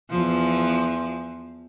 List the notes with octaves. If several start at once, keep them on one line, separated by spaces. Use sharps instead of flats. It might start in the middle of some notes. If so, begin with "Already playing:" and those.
E2 F3